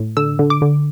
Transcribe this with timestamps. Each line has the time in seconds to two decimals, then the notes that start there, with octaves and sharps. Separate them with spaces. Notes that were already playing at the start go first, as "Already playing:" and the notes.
Already playing: A2
0.17 D3 E6
0.39 D3
0.50 D6
0.62 D3